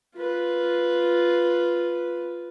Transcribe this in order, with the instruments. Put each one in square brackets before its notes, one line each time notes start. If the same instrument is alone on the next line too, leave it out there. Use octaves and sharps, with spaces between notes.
[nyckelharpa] F4 B4